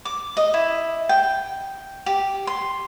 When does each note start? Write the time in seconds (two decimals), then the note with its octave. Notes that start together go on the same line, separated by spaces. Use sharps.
0.05 D6
0.37 D#5
0.54 E4
1.09 G5
2.06 G4
2.47 C6